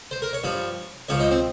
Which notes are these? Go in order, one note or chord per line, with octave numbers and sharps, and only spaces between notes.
C5
A#4
C#5
G2 F3 C#5
C#2 C#3 F3 C#5
D#4
C4